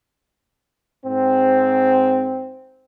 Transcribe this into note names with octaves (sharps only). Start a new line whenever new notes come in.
G#2 C4